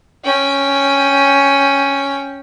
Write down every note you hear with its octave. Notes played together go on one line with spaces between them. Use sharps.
C#4 G5